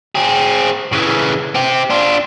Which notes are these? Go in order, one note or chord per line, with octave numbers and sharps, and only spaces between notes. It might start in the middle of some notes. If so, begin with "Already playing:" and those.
C4 G#4
C#3 E3
C4 G4
D4 F4